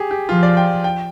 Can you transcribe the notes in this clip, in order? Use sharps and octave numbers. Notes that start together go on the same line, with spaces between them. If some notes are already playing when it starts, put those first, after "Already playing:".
Already playing: G4 G#4
G4
F3 F4
D5
G5
G5